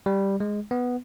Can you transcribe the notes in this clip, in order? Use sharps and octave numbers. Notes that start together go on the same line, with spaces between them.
G3
G#3
B3